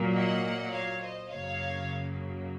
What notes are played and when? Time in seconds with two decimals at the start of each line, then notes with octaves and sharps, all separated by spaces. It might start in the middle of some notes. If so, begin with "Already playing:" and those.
Already playing: A#2 F#3 A#3
0.14 D#5 F#5
0.71 C#5 F5
1.00 C5 D#5
1.29 F#2 C#3 F#3 A#3 C#5 F5